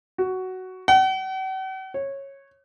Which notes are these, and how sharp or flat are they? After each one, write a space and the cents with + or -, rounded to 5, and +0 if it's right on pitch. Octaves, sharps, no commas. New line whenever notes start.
F#4 +10
F#5 +45
C#5 -15